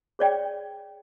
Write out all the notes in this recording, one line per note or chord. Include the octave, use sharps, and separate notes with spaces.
G#4 C#5 D5 G5